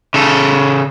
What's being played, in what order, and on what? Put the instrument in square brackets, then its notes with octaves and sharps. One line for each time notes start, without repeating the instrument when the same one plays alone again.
[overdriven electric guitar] C#3 A4